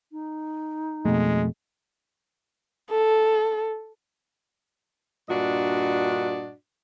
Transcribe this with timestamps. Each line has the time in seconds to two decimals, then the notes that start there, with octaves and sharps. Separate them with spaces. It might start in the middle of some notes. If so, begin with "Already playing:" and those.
0.12 D#4
1.05 F2 B2 G#3 A3
2.90 A4
5.29 G2 A#2 D4 F#4 D#5